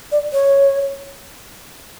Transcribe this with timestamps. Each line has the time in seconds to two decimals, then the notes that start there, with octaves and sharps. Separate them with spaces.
0.12 D5
0.33 C#5